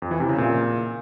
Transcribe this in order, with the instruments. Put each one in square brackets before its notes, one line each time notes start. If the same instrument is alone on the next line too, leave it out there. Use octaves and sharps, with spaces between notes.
[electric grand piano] F2
E3
C3
C#3
A#2